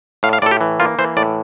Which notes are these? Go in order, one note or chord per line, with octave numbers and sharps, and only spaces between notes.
A2 F5
F5
A2 A4 D5
G4
E3
A#3 F4
E3 C5
A2 D5